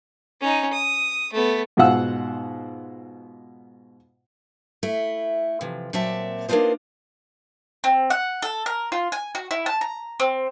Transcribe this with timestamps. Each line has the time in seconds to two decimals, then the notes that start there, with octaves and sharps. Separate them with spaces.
0.41 C#4 D#4
0.73 D#6
1.33 A3 B3
1.77 G#2 B2 F4 F5 F#5 E6
4.83 A3 E4
5.61 C3 E3 F3
5.93 A#2 F#3 C4 D5 E5 A5
6.49 A#3 B3 D4 D#4 F4 C5
7.84 C4
8.10 F#5
8.42 A4
8.66 A#4
8.92 F4
9.12 G#5
9.35 F#4
9.51 E4
9.66 A5
9.81 A#5
10.20 C4